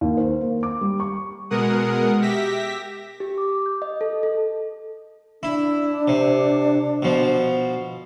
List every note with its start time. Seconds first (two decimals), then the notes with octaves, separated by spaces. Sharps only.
0.01 D#2
0.17 C5
0.41 A#3
0.63 D6
0.81 G3
1.00 C#6
1.50 B2 G#3 A#4 F#5 D#6
2.22 G4 E5 A#6 B6
3.20 G4
3.38 D6
3.66 G6
3.82 D#5
4.01 A4
4.23 A4
5.43 D4 E4
6.08 C3
7.02 B2 F3